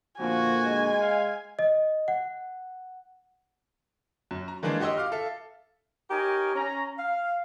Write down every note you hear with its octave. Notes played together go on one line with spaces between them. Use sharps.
A#2 D3 F3 A#3 F#4 G#5
G#3
F5
D#5
F#5
F#2
A#5
D#3 E3 G#3 A#3 D4 G#4
F#4 G4 D#5 C6 E6
F5 D6 F6
A4 E5 F5
D#4 G4 A#4 C#5 G#5 A#5
C#4 A#5
F5